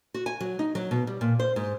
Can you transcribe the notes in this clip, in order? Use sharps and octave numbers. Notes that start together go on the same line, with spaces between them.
F#4
G#5
F#3
D#4
F#3
B2
G3
A#2
C5
G#2